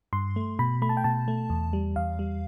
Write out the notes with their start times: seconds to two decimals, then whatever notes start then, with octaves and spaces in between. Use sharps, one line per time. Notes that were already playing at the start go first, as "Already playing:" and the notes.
0.13 G2 C6
0.36 A3
0.59 B2 B5
0.82 A3 B5
0.89 A5
0.97 G5
1.04 B2 A5
1.28 A3
1.50 E2
1.73 G3
1.96 E2 F5
2.19 G3